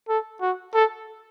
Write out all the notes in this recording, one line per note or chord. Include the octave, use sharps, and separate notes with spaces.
A4
F#4
A4